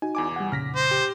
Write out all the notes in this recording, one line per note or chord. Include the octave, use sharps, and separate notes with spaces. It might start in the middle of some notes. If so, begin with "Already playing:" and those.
D#4 F#4 G#5
E2 G#5 D6
G3 F#5
F2 A#2 C#3 F6 A#6 B6
C5
G4